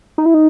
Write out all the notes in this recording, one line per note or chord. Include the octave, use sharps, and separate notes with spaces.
D#4
E4
D#4